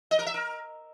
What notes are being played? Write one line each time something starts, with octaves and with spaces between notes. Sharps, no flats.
D#5
A#4
E5
A#4